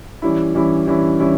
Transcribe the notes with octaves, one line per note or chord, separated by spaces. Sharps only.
E3 G3 C#4 E4
E3 G3 C#4 E4
E3 G3 C#4 E4
E3 G3 C#4 E4